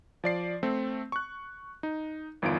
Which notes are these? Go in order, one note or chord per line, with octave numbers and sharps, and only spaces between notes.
F3 D5 C7
A3 C4
C#6 F#6
D#4
G1 E2 D#3 F4 D7